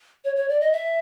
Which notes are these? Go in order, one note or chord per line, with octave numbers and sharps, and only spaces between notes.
C#5
C#5
D5
D#5
E5